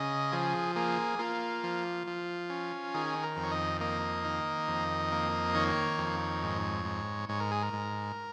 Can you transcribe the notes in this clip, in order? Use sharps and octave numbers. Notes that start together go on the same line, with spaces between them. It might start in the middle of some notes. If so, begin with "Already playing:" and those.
Already playing: C#3 D#5
F3 G#4
A#3 G#4
A#3 F4
F3
F3
C#4
D#3 G#4
A#4
F2
C#5
D#5
A#3 D#5
D#3
F2
A#3
D#3 C#5
F2
G#2
G#2
G#2 C#5
A#4
G#4
A#4
G#2